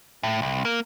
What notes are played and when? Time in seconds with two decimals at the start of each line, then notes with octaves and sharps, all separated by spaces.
0.23 A2
0.42 C2
0.65 A#3